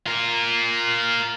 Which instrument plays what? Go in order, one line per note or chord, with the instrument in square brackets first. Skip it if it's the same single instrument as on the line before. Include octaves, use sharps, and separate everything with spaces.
[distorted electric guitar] F4 A#4